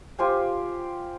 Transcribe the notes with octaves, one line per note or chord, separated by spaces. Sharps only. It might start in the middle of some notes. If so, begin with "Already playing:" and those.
F4 G4 C5 G#5